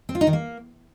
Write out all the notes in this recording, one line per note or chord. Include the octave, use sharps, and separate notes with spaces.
C4
F4
D#4
D#3
A#3